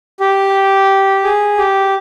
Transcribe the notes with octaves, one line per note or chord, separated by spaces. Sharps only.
G4
G#4
G4